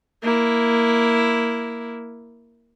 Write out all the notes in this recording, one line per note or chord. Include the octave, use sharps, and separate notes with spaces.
A#3 E4